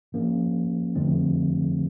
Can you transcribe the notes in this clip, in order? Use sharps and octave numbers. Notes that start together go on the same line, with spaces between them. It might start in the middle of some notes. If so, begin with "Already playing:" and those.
G#2 F3 A#3 C#4
F2 D3 F3 A3 C4